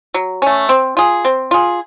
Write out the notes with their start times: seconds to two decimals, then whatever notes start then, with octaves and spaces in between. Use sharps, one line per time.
0.14 F#3
0.42 A3 C#4
0.69 C4
0.97 F4 G#4
1.25 C4
1.51 F4 G#4